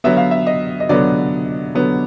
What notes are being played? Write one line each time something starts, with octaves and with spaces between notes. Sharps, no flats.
D3 F#3 B3 E5
F5
E5
D#5
D#5
D3 F#3 B3 D5
D3 F#3 B3